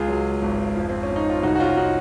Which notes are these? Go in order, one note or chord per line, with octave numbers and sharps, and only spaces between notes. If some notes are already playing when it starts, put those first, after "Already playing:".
Already playing: C#2 F4 G#4
F#3
G#1
F2
C4
C#4
F2
D#4
F4
C2 D#4 F#4
F#4
C#4 F4
D#4 F#4